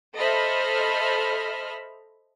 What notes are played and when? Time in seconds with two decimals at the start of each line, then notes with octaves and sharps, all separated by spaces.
0.15 A4 C5 D#5 E5 B5 F6